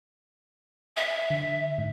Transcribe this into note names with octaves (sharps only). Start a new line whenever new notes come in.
E5
D3
G#2